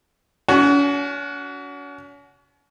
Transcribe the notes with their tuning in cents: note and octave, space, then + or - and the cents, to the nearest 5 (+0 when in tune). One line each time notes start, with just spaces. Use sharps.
C#4 +40 F#4 +0 G#5 +0